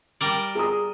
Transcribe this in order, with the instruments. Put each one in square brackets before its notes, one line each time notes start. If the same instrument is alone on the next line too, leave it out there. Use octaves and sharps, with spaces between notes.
[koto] G3 A#4 D5
[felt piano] G#4 A#5 D#6